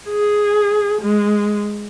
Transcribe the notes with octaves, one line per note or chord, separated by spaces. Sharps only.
G#4
G#3